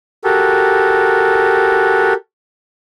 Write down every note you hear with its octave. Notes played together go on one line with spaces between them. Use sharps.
F#4 G4 A4 A#4